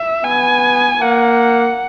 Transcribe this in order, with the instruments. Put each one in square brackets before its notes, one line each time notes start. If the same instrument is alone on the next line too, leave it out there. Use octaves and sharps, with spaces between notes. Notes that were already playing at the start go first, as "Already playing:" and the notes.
Already playing: [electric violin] E5
[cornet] B3 [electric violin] G#5
[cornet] A#3 [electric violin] F#5